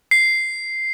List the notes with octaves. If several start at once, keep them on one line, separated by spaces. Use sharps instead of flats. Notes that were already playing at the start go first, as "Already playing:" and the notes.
C7